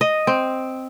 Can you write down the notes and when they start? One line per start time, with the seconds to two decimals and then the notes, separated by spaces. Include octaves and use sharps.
0.01 D#5
0.27 C4